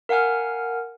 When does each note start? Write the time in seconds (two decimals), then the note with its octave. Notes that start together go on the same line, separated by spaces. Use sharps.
0.09 A#4 F5 F#5 G#5 F6